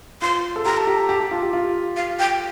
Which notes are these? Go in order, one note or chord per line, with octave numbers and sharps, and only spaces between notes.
F4 C6
A4
G4 A#5
A5
G4 A#5
G4 A5
G4
F4
G4
F4
F5
G5